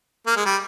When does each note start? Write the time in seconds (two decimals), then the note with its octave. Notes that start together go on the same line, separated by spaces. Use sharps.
0.26 A#3
0.36 G#3
0.46 G3